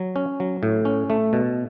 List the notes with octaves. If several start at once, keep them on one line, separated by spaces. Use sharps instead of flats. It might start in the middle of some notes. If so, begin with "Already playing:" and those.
Already playing: F#3
C#4
F#3
A2
C#4
A3
B2